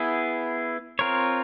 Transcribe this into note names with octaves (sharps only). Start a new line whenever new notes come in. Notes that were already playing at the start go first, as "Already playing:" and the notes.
Already playing: B3 E4 G#4
C4 F4 A#4 C#5